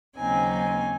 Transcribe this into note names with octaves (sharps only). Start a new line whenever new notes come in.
D#2 C#3 F#3 C4 D#4 G#5
G#5